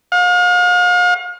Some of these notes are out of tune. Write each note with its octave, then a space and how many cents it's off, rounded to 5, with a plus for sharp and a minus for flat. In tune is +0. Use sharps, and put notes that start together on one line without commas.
F5 +40